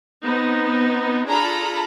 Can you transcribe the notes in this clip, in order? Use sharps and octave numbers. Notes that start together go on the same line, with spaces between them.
B3 C4 D#4
D4 F4 G#4 A4 A#5 B5